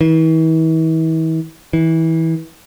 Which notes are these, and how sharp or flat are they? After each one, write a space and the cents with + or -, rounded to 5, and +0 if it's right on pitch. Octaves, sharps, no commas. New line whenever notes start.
E3 -40
E3 -25